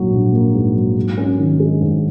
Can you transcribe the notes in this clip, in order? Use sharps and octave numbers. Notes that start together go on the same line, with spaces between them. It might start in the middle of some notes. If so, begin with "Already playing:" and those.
Already playing: A#1 G#2 F#3 A#3
A#1
A#3
G#2
F#3
G#2
C#4
D#3
G#3
G#2